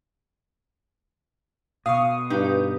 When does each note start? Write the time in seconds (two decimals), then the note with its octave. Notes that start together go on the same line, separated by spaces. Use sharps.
1.86 B2 F5 C#6 D#6
2.30 G2 D#4 G4 B4